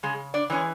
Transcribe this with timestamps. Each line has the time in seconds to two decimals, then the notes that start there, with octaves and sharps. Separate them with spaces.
0.03 C#3 G#3 G#4
0.34 D4 D5
0.50 E3 G#3 C#4